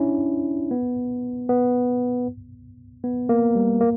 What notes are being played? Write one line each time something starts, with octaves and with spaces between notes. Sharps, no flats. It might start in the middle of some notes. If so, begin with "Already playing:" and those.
Already playing: C#4 D4 E4
B3
B3
B3
A#3
G3
A#3